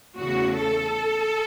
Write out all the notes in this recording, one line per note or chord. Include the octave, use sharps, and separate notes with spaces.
E2 C#3 A3 F#4
A4